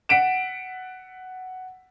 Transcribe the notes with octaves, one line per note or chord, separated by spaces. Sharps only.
F#5 B6 D7 E7